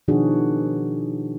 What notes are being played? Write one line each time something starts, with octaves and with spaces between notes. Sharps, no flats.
B2 D#3 F3 D4 F#4 G#4